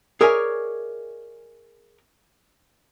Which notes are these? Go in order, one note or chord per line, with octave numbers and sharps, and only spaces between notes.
G#4 A#4 C#5 D5 E5 G#5